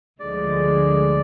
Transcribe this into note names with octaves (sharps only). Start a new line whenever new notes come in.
D2 D3 F3 G#3 D5